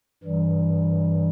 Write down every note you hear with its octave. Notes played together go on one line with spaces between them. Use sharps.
G2 E3 G3